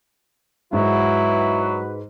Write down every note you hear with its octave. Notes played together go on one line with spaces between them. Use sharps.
G#2 F#3 E4 F#4 B4